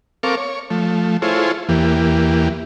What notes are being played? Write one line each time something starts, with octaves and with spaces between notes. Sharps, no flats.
C4 A4 A#4 F5 C#6 D6
C#5
F3 A3
E4 F4 G#4 A4 C5 C#5
E2 E3 A#3 G4